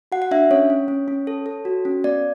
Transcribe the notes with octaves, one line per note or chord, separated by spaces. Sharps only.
F#4 F#5
F#5
D4 E5
C#4 C#5
C#4
C#4
C#4
A4
A4
F#4
C#4
B3 D5